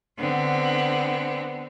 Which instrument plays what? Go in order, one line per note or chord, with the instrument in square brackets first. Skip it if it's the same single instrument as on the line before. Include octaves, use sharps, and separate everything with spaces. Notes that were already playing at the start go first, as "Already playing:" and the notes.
[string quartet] D3 B3 C4